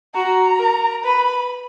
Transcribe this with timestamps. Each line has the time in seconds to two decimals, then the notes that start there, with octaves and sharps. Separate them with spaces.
0.14 F#4 A#5
0.59 A#4
1.04 B4 B5